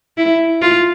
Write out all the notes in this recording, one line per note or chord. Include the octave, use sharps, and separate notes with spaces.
E4
F4